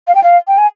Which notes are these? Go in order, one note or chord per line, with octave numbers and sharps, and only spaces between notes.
F5
G5
F5
G5
G#5